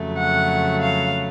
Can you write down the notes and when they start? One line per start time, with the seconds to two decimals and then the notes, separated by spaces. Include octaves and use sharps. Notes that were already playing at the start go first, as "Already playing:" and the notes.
Already playing: F2 C#3 F#3 A3
0.18 F#5
0.82 F5